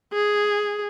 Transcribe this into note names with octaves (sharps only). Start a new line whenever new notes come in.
G#4